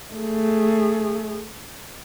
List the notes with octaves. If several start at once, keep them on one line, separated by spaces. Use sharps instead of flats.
A3 G#4